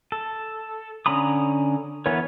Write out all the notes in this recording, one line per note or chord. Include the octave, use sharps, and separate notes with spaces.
A4
D3 C#4 A#5 B5 D#6
E3 B3 A#4 C#5